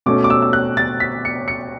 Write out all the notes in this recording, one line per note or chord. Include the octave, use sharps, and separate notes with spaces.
B2 A3 C#4 D6
D6
E6
E6
F#6
A6
B6
C#7
C#7